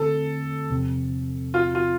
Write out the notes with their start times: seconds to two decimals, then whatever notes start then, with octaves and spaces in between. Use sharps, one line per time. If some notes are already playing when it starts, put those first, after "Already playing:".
Already playing: D3 A3 C4 A4
0.70 E2 C3 F3 C4
1.54 F4
1.75 F4